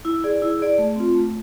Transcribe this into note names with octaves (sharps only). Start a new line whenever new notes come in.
E4
G#4 D5
E4
G#4 D5
A3
C4 F4
A3